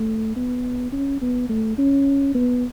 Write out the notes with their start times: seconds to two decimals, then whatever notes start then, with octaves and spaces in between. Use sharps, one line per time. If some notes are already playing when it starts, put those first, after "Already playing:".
Already playing: A3
0.36 B3
0.92 C#4
1.22 B3
1.50 A3
1.78 C#4
2.35 B3